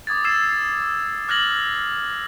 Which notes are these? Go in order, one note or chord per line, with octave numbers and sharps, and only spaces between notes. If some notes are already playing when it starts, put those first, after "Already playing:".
D6 D#6 G#6 A6
E6 G#6 A6 C7 E7
D6 F6 F#6 G#6 A#6 F#7